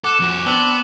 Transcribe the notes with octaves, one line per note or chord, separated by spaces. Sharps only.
A4 F#5 D6 F#6 E7
F2 F#4
B3 C4 D4 F#6 F#7 G7